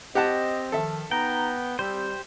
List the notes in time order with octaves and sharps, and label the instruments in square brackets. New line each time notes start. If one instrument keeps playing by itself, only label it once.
[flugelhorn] C4 [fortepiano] G4 F#5 A5 [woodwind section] D#5
[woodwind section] D#3 F3 [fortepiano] A4 E5
[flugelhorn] B3 [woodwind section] D#4 A#5 [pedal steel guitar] G5
[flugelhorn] G3 [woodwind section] C4 [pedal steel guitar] G4 C5